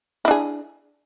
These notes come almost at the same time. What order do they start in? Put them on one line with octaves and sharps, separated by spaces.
E4 D4 G#4